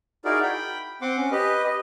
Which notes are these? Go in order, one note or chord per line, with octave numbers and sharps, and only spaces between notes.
D#4 E4 F#4 G#4 A#4 D5
G5 B5
C4 F#5 C6 D6
C#4
G4 B4 D#5
D#5